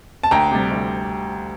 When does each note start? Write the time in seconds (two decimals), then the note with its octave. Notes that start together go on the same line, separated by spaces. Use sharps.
0.23 A5
0.31 D2 G5 A#5
0.51 C3 G3
0.71 D2